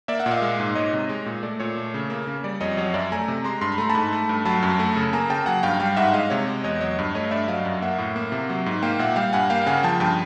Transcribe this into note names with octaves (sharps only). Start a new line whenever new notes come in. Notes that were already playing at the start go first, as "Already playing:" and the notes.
A#3 D5 E5
E5 F#5
A#2
D#5 F5
G#3
G#2
G#3 C#5 D#5
C3
G#3
A#2
A3 D5
A#2 C#5
A3
C#3
A#3
C#3
G3 D5
F2 C#5 D#5
F#3 C#5 D#5
F#2 D5 E5
A3 G#5 A#5
C3
G#3 A#5 C6
G2 C6
B5
A3 A#5
A5 B5
G#2
A3
G2
F#3 A5 B5
F#2
A3
C#3
A#3 G#5 A#5
C#3 G5 A5
F#3 F#5 G#5
G2 F5 G5
G3 F5 G5
G#2 E5 F#5
G#3 D#5 F5
C3 C#5
G#3
E2 C#5 D#5
F#3 C#5 D#5
G2
A3 C#5 D#5
G2 D5 E5
F#3 D#5 F5
F#2
A#3 E5 F#5
A2
A#3
C3
F#3
G#2
A#3 F5 G5
A#2 E5 F#5
G3 F5 G5
G2 F#5 G#5
A#3 F5 G5
C#3 F#5 G#5
F3 G5 A5
G2 G5 A5